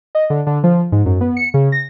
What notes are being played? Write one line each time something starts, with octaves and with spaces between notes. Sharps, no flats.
D#5
D3
D3
F3
G#2
F#2
B3
C#7
C#3
A#6